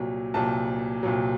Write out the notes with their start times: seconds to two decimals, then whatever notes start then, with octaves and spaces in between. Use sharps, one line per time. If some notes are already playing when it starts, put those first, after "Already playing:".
Already playing: C2 A#2 F#3
0.34 C2 A#2 F#3 A5
1.03 C2 A#2 F#3